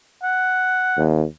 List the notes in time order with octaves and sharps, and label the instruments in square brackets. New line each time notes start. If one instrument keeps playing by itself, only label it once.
[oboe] F#5
[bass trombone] D#2